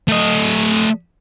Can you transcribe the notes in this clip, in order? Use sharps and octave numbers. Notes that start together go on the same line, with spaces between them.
A3 D#5